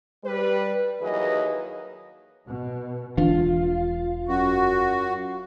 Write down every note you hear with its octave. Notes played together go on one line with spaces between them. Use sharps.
G3 B4
D#2 E3 F#3 G#4 B4 D#5
B2
E1 E3 D4 F4
F#2 F#4